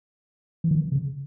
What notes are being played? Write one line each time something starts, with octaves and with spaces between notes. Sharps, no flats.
E3
D#3
C#3